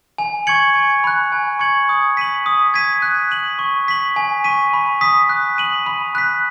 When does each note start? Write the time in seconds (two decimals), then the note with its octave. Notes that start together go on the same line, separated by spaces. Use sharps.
0.18 G#5
0.47 C#6 G#6 C#7 F#7
0.75 G#5
1.04 B5 F#6
1.32 G#5
1.60 C#6 G#6 C#7 F#7
1.89 D#6
2.17 B6 D#7 F#7
2.46 D#6
2.74 G#6 B6 D#7
3.02 F#6
3.31 D#7 F#7
3.59 C#6
3.88 B6 F#7
4.16 G#5
4.44 C#6 B6 D#7
4.73 B5
5.01 D#6 B6
5.29 F#6
5.58 D#7 F#7
5.86 B5
6.15 F#6 B6